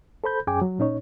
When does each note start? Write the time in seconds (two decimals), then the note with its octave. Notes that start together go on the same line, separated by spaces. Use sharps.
0.24 A4 C5 B5 G6
0.47 F#2 C#4 G#4 G5 G#5 D6
0.61 F#3
0.79 A#2 C#4 D#4 C#5